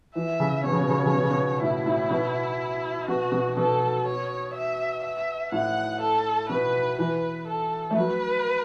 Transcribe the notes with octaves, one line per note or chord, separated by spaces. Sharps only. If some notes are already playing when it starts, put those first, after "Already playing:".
E3 E5
C#3
B2 C#5
C#3
B2
C#3
B2
C#3
B2
C#3
B2
A2 E4
A2
B2
B2 F#4
B2
B2 A4
C#5
E5
E5
A2 F#5
A4
B2 B4
E3 B4
A4
A3
F#3 B4